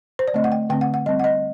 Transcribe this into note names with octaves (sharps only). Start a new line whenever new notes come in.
C5
D5
D3 A3 C4 D#5
F#5
G5
D3 A3 C4 G5
F#5
F#5
G3 C4 D#5
F#5
D#5